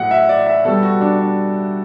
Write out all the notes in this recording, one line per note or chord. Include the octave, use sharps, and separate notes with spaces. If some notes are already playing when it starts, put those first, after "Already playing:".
Already playing: A2 F#3 F#5
E5
D5
E5
B2 G3 A4
F#4
D4
D4